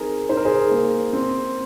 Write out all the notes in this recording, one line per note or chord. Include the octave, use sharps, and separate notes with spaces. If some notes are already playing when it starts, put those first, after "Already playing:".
Already playing: C4 D#4 G#4 A#4
D#4 C5
A#4
G#4 C5
A#3
C4